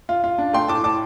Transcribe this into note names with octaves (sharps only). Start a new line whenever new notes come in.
F4
F4
D4
A3 G5 C6
A2 A5 D6
A2 A5 D6